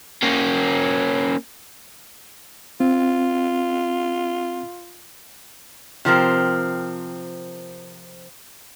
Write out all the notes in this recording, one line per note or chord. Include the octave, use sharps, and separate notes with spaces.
A#3 C#4
C4 F4
C3 F3 C4 A#4